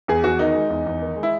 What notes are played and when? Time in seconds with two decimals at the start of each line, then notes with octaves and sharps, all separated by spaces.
0.08 E2 G#4
0.24 E2 F#4
0.39 D#3 D#4
0.55 G#3
0.70 E2
0.86 E2
1.02 D#3
1.16 G#3
1.23 E4